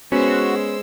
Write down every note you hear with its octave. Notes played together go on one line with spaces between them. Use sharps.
G#3 B3 C#4 F#4 C5 E6